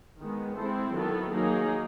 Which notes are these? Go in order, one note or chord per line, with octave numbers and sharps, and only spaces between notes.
D#3 G#3 B3
G#3 C4 E4 A4 C5
D#3 F#3 B3 E4 A4
F#3 A#3 D#4 G#4